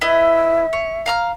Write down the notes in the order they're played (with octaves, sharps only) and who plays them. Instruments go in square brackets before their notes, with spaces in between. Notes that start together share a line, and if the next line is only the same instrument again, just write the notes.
[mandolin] E4 B4 D#5 [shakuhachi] E5
[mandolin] C#5
F5 A#5 F6